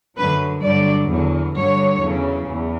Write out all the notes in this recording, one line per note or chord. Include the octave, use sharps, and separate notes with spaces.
F#2 D3 F#3 B4
G2 D3 F#3 D5
E2 D3 F#3
G2 D3 F#3 C#5
E2 C#3 F#3
E2